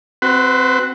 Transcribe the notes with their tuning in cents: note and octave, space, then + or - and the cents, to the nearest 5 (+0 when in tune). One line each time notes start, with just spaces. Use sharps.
C4 -5 F#4 +0 B4 +30